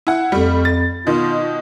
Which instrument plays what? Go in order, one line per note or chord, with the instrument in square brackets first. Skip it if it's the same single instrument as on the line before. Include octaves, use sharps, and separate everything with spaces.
[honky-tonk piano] E4 F#5
[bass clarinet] F2 [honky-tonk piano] G3 A3
[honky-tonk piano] A6
[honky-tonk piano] B2 D#3 [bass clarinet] F4